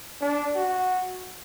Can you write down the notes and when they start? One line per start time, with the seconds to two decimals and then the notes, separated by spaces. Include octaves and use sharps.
0.21 D4
0.55 F#4